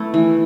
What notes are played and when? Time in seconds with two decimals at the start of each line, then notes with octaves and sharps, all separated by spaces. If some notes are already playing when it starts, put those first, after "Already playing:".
Already playing: A3 B3 E4
0.14 E3